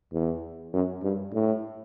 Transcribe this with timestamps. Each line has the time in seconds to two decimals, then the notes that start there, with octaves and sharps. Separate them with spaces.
0.13 E2
0.73 F#2
1.03 G2
1.34 A2